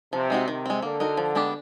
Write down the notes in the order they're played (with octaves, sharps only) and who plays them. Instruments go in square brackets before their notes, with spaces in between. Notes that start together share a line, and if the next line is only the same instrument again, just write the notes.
[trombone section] C3 [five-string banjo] F3
[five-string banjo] G#3 C4 D#4 F#4
[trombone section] C3 [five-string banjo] D#3
[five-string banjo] G#3 C4
[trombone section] D3 [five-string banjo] A#3
[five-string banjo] D#4 F#4 A#4
F3
G#3 B3 D4 G4